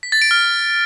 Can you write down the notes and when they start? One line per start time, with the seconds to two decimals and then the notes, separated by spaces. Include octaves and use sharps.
0.03 B6
0.12 A6
0.22 D7
0.31 F6